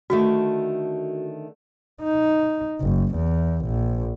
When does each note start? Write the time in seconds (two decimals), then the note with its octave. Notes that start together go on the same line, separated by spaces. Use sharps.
0.10 D3 D#3 A3 F#4
2.02 D#4
2.81 F#1
3.15 E2
3.66 A#1